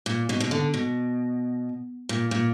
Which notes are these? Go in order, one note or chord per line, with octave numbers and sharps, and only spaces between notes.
A#2
B2
B2
D3
B2
A#2
A#2